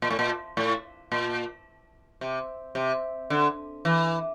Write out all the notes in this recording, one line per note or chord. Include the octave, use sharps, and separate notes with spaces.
A#2
A2
A#2
A2
A#2
C3
C3
D3
E3